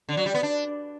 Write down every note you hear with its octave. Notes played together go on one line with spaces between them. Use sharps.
D3
F#3
G3
B3
D4